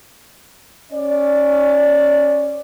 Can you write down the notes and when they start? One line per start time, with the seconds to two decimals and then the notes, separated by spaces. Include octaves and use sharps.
0.92 C#4 D5